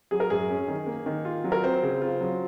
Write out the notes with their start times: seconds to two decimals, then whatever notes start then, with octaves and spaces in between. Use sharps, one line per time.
0.11 F#3 G#4
0.20 A#4
0.30 F#2 G#4
0.49 C#4
0.68 D#3
0.87 A#3
1.06 D#3
1.25 F4
1.44 F#3
1.52 A#4
1.63 C4 C5
1.83 C#3
2.02 F4
2.21 F#3